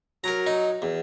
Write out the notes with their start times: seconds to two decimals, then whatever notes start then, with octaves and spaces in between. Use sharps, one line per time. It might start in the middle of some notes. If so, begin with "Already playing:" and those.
0.24 F#3 A#4 A#5
0.47 D#4
0.82 E2